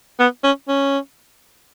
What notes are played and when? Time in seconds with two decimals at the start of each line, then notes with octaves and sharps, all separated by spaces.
0.19 B3
0.44 C#4
0.69 C#4